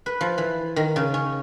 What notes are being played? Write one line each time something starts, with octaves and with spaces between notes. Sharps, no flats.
B4
F3
E3
D#3
C#3
C#4